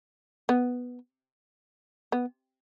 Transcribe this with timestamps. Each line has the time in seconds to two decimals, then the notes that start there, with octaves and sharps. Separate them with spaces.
0.49 B3
2.12 B3